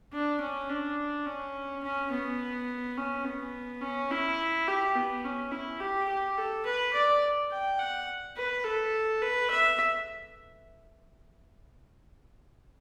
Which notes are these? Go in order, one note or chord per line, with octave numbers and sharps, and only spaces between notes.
D4
C#4
D4
C#4
C#4
B3
C#4
B3
C#4
E4
G4
B3
C#4
E4
G4
G4
A4
B4
D5
G5
F#5
B4
A4
B4
E5